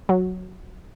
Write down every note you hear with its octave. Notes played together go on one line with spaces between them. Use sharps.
F#3